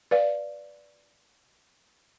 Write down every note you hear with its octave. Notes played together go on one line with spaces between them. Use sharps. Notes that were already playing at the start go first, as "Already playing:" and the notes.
B4 D5 F5